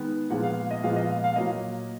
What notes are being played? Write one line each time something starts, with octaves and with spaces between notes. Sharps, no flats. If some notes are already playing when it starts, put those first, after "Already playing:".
Already playing: D#3 G#3 B3
A#2 F3 G#3 B3 F#5
F5
D#5
A#2 F3 G#3 B3 F5
D#5
F5
F5
A#2 F#3 A#3 D#5